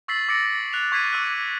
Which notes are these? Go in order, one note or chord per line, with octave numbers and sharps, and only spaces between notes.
C#6 E6 A6 B6 C7 F#7
D6 E6 A6 A#6 C#7 D7
F#6 F7
C#6 G#6 B6 C7 D#7
C#6 D6 E6 F#6